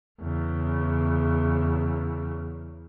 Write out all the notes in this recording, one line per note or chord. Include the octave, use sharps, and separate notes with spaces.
E2 C#3